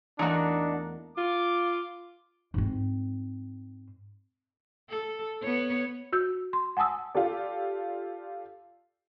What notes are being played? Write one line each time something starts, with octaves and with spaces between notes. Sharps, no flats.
E2 A3 A#3 D4 D#4 F#4
F4 D6
G#2 C4
A4
B3 C#5
F#4 E6 G6
C6
F#5 G#5 A5 D#6 E6
F4 G4 A4 D5